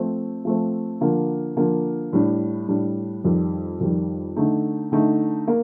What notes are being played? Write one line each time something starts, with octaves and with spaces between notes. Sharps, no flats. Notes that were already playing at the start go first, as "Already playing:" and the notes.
Already playing: F3 A3 C4
F3 A3 C4
D3 F3 A#3
D3 F3 A#3
A2 G3 D4
A2 G3 D4
F2 D#3 G3
F2 D#3 G3
D3 A3 D#4
D3 A3 D#4
A#3